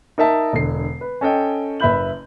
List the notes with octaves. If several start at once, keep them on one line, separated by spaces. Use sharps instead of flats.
D#4 A#4 E5 A5
E1 D3 C7
B4
C#4 A4 D#5 G5
F#1 B4 E5 B5 G6 F#7